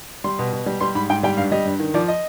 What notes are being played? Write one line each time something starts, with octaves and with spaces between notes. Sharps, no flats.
G3 C6
B2
B2
G3
G3 C6
G#2 B5
G#2 G5
G3 G5
G2 F5
G3 D#5
G2
D#3
F3 D5
D#5